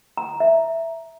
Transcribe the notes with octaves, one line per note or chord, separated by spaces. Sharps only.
A#5
A#5
E5